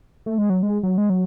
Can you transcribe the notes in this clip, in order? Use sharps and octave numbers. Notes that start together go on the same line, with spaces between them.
A3
G#3
F#3
G#3
F#3
G#3
F#3